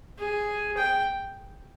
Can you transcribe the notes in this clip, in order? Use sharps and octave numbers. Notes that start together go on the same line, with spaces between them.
G#4
G5